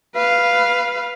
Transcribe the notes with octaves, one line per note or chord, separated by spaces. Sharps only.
B4 F5